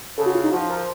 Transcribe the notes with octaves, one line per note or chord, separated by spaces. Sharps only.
C#3 A4
F#4
F4
D#4
F3 F#4
A#4